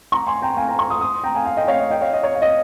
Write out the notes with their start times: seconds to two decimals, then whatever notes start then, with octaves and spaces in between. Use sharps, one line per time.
0.12 A#5 C#6
0.27 G#5 C6
0.42 G5 A#5
0.57 F5 G#5
0.68 G5 A#5
0.79 A#5 C#6
0.90 C6 D#6
1.01 C6 D#6
1.23 G5 A#5
1.35 F5 G#5
1.45 F5 G#5
1.57 D#5 G5
1.68 C#5 F5
1.79 D#5
1.90 D#5 G5
2.01 C#5 F5
2.13 D#5
2.23 C#5
2.35 F5
2.42 D#5